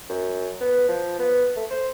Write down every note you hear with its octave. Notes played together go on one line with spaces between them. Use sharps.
F#2
B3
F3
B3
A3
C5